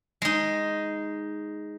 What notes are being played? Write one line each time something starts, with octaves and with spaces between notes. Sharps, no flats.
G#3 D#4